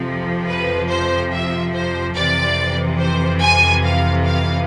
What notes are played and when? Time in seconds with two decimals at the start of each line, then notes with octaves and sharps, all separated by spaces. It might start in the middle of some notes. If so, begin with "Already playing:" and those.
Already playing: F2 C3 F3
0.47 B4
0.89 C5
1.31 E5
1.73 C5
2.15 F2 C3 E3 D5
2.99 C5
3.41 G#5
3.84 F5
4.26 F5